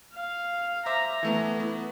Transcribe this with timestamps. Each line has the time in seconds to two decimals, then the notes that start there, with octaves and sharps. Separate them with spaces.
0.14 F5
0.86 C5 E5 A#5 D6
1.23 E3 A3 B3
1.60 B3 E4